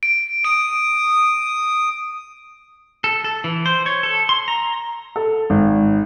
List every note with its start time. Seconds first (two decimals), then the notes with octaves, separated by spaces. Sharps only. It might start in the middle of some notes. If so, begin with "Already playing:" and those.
0.03 D7
0.45 D#6 D7
3.04 A4
3.24 A4
3.44 E3
3.66 C5
3.86 C#5
4.03 A4
4.29 C6
4.48 A#5
5.16 A4
5.50 G#1